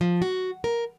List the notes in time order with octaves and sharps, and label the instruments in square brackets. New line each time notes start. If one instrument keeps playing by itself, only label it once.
[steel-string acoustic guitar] F3
F#4
A#4